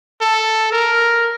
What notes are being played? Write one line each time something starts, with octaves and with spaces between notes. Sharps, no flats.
A4
A#4